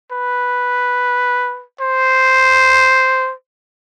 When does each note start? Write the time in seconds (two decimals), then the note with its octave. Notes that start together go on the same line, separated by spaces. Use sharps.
0.11 B4
1.80 C5